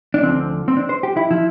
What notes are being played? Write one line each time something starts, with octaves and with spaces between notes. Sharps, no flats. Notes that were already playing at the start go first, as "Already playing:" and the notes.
D4
D2 D3 F3 C4
C4
D4
C5
G4
E4
F3 E4